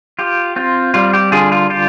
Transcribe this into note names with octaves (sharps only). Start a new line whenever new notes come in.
F4 G4
C4 F4
G3 F4
G4
D3 F4 G#4
F4
F4 G4